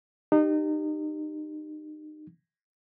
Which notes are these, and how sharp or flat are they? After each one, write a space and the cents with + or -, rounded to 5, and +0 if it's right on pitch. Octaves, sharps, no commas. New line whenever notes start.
D#4 -30 G4 +0